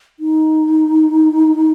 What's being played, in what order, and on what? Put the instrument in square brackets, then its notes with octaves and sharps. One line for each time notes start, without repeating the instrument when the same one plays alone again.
[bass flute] D#4